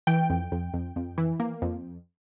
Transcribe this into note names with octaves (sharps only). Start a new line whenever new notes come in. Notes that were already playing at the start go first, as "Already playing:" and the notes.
E3 G5
F2
F2
F2
F2
E3
A#3
F2